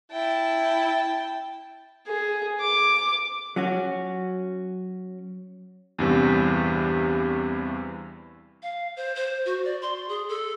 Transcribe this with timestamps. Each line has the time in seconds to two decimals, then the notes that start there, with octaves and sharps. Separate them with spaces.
0.12 E4 G5 A5
2.07 G#4
2.60 D6
3.56 F#3 C#4 F#4
5.99 E2 G2 C3 E3
8.63 F5
8.97 C5
9.15 C5
9.46 F#4
9.65 D5
9.82 C6
10.09 G#4
10.29 A4